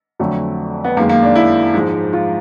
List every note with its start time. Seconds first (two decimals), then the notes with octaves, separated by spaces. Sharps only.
0.19 F2 D3 F#3 A3
0.84 B3
0.97 F#2 D#3 G#3 A#3
1.09 A#3
1.22 D4
1.35 E4
1.74 G#2 F3 G#3
2.13 F4